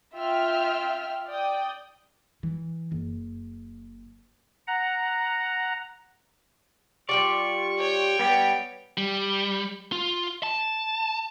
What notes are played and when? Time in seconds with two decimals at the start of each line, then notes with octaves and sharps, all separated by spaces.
0.15 F4 E5 G5 F6
1.27 D5 G5 D#6
2.43 E3
2.92 F#1
4.67 F#5 A#5
7.09 G3 F4 G4 D5 C#6
7.78 C#5 G5
8.19 G3 B3 G4
8.97 G3
9.92 F4
10.43 A5